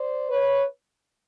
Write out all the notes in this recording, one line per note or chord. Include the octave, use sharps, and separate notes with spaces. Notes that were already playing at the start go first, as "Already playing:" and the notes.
Already playing: C5 D5
B4 C#5